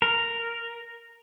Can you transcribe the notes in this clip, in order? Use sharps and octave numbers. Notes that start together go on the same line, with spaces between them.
A#4